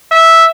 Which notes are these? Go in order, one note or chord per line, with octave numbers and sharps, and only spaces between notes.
E5